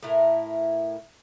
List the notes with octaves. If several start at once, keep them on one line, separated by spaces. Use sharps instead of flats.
A2 E4 A#4